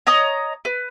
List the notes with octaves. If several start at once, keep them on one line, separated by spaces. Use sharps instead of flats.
C#5 D#5 A#5 D#6
B4